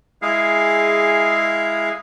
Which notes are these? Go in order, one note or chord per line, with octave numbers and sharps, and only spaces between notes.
G#3 E4 G#4 F5